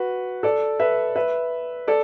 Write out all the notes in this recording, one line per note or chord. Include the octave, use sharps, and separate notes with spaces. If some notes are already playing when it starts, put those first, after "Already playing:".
Already playing: F#4 B4
A4 D5
B4 E5
B4 E5
A4 D5